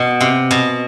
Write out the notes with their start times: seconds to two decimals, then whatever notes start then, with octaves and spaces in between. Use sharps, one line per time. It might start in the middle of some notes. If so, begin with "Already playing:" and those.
Already playing: B2
0.21 C3
0.51 B2